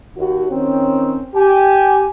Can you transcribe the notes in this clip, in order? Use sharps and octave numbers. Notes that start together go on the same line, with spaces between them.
D#2 F#4
D#3 C4 C#4
G4 G#5